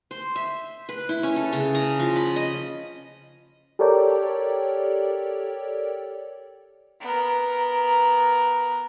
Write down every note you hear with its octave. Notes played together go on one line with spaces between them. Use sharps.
C5
E5
B4
E4
C#4
A4
C#3
A#5
F3
B5
D#5
G4 A4 A#4 C#5 D5 G5
B3 A#4